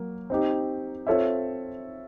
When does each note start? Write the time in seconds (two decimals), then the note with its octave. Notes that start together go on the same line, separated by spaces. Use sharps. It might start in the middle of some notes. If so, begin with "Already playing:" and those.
Already playing: F#3 A#3
0.30 C4 D#4 G4
1.07 C4 F4 A4 C#5 E5